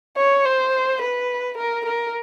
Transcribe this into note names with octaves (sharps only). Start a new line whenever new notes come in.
C#5
C5
B4
A#4
A#4